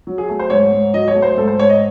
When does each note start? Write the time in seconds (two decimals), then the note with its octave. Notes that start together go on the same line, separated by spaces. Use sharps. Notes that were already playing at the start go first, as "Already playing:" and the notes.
0.07 F#3
0.18 G#4
0.29 A3
0.39 C5
0.50 G#2 C#5
0.72 G#2
0.94 F#3 D#5
1.08 C#5
1.15 A3
1.22 C5
1.37 G#2 A4
1.48 C5
1.58 G#2 C#5
1.69 D#5